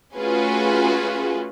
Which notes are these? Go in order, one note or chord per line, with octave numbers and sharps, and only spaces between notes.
A3 C#4 F4 F#4 G#4 B4